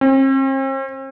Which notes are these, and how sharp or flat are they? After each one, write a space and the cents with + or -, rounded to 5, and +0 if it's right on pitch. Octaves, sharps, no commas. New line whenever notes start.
C4 +45